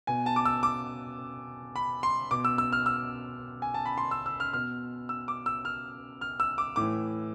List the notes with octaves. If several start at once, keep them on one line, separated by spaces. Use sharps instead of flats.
B2 G#5
A5
D6
E6
D6
B5
C6
B2 D6
E6
E6
F6
E6
G#5
A5
B5
C6
E6
E6
F6
B2 F6
E6
D6
E6
F6
F6
E6
D6
A2 E3 D6